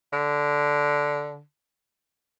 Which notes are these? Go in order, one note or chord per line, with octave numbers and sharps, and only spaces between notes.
D3